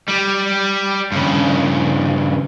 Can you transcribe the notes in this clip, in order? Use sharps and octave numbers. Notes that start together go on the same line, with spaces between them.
G3
G2 C#3